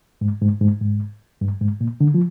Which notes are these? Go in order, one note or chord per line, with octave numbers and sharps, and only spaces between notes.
G#2
G#2
G#2
G#2
G2
G#2
A#2
D3
F3